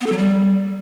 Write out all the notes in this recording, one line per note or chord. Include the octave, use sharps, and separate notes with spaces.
B3
A4
F#3
G3